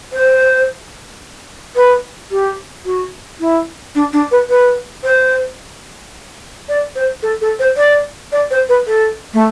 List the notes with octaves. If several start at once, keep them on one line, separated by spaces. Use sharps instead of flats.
C5
B4
G4
F#4
E4
D4
D4
B4
B4
C5
D5
C5
A4
A4
C5
D5
D5
C5
B4
A4
A3